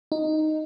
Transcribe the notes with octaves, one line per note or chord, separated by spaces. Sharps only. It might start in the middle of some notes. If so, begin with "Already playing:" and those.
D#4